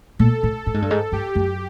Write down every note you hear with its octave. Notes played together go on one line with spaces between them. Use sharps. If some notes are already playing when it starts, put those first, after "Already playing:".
A#2 A4
A2
A2
G#2
G2
G#2
G2 G4
F#2